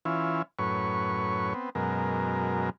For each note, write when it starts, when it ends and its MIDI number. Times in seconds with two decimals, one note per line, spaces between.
0.05 0.42 52
0.05 0.42 61
0.05 0.42 64
0.05 0.42 65
0.59 1.53 42
0.59 1.53 45
0.59 1.53 71
0.59 1.53 73
0.59 1.53 85
1.54 1.70 59
1.54 1.70 60
1.75 2.70 42
1.75 2.70 47
1.75 2.70 56
1.75 2.70 70